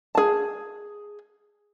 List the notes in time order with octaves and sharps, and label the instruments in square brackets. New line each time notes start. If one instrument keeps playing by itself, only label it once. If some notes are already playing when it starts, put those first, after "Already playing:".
[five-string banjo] G#4 A5